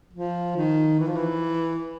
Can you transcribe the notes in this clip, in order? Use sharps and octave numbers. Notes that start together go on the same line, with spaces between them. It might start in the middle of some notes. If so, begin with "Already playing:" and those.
F3
D#3
E3
F3
E3